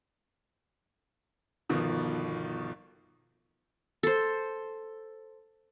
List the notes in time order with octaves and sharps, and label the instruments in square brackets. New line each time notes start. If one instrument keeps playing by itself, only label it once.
[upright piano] G1 B2 D#3 F3
[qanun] A4 C5